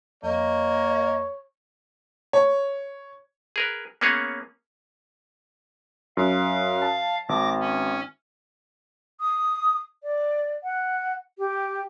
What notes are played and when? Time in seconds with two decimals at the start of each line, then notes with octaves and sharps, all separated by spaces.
0.23 F2 A#3 C#5 D#5
2.33 C#5
3.56 G#4 A#4 B4
4.01 A#3 B3 C#4 G#4 C#5
6.17 F#2 F5
6.82 A5
7.29 G#1 D6 A#6
7.60 C#4
9.20 D#6
10.03 D5
10.63 F#5
11.38 G4